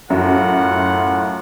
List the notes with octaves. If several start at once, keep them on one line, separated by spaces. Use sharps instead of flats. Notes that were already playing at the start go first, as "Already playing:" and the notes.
F#2 A2 F4 F#5